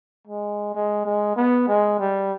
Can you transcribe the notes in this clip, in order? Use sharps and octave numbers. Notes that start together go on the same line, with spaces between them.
G#3
G#3
G#3
B3
G#3
G3